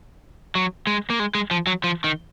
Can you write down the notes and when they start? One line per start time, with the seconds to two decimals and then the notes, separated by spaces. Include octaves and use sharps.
0.55 F#3
0.87 G#3
1.10 A#3
1.20 G#3
1.35 G#3
1.51 F3
1.67 F#3
1.84 F3
2.04 D#3